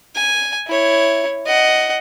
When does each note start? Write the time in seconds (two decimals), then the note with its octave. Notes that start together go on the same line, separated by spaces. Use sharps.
0.15 G#5
0.67 E4 C#5
1.46 D#5 F#5